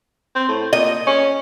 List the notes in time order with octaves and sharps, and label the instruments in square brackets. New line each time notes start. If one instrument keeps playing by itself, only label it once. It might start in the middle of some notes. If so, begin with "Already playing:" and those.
[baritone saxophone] C4
A2
[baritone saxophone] A#2 [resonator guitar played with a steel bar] D#5
[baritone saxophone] C#4